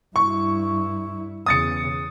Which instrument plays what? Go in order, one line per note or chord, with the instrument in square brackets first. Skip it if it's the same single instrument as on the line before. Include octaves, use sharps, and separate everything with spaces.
[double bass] G2 E4 [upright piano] C#6
[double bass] E2 C#3 [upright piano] D#6 A6 C#7